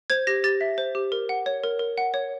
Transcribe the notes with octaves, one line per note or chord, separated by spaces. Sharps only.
C5 G#6
G4 A#6
G4 A6
E5
C5
G4
A#4
F#5
C#5
A#4
A#4
F#5
C#5